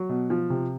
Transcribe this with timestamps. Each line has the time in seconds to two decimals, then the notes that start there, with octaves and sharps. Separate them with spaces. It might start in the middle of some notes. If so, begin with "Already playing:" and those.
Already playing: F#3
0.09 B2
0.30 F3
0.50 C3